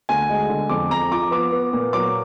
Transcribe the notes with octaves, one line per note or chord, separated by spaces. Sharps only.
D2 G#5
G#3
D3
F2 D6
F2 A#5
F3 D6
B3 D6
B3
A#2
F#3 D6